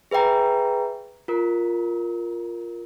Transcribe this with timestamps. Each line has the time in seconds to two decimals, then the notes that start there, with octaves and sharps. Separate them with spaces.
0.11 G#4 B4 E5 G5 A#5
1.28 F4 A#4